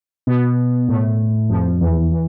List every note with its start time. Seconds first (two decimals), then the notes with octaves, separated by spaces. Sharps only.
0.27 B2 B3
0.88 A2 A3
1.50 F2 F3
1.81 E2 E3
2.11 E3